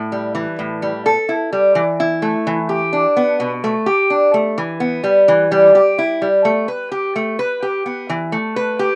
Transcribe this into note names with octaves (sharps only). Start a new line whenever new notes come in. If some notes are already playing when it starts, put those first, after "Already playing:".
Already playing: A2
G3
E3
A2
G3
A4
E4
G3
E3
E4
A3
E3
G4
D4
B3
B2
A3
G4
D4
A3
E3
B3
G3
E3
G3
G4
E4
G3
A3
B4
G4
A3
B4
G4
B3
E3
A3
B4
G4